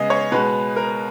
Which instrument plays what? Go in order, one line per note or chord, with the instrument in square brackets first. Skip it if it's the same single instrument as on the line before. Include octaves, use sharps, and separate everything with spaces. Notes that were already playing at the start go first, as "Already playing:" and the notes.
Already playing: [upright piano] C#3 G#3 B3 G#4 D#5
C#5
B2 G#3 B3 B4
A#4